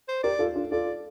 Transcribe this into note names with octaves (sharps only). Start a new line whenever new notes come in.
C5
G4 A#4 D5
F4 A4
D4 F4
F4 A4 D5